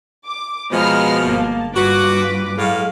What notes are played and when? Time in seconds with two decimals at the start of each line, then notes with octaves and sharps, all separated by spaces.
0.24 D6
0.71 B2 F3 G#3 A#5 B5 F6
1.24 G1 A#3 A5
1.75 G2 F4 F#4 B4 D6
2.58 A2 F#3 G#3 F5